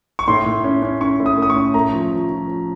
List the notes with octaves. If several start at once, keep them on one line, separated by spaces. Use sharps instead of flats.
C#6
A2 C6
A2
C#4
C#4
C#4 C#6
A2
D#6
A3 D#6
C#6
C#4
A3 A#5
F3
F3
F3
F3